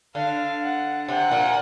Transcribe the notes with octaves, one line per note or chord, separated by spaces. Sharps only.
D3 F5
F#5
C3 F#5
A#2